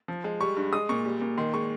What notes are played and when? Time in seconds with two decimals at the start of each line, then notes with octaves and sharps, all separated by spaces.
0.08 F3
0.24 G#3
0.40 G3 C#6
0.56 G2
0.73 G#3 D#6
0.89 A#2 C#6
1.05 G3
1.21 A#2
1.37 D#3 C6
1.54 G#3 C#6